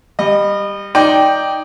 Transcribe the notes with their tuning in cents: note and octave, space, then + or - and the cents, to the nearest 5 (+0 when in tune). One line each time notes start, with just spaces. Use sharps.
G3 +10 D#5 -30
D#4 +0 D5 -10 G5 +0